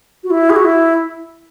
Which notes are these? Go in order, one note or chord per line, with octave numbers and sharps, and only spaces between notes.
F#4
E4
G#4
F#4
E4